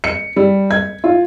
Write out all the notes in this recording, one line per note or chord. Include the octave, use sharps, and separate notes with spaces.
C#7
G3
G#6
F4